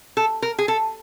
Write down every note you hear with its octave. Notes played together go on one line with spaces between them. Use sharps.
A4
A#4
G#4
A4